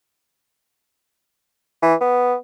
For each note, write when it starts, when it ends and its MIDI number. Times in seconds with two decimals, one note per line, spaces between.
1.82 1.95 52
2.01 2.36 59